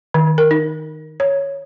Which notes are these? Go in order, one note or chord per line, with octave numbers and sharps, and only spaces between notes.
D#3
A#4
D#4
C#5